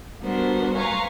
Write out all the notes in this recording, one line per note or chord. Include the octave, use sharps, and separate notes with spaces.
G3 B3 D4 F#4 A#4 C5
B4 F5 G#5 A#5 C6 C#6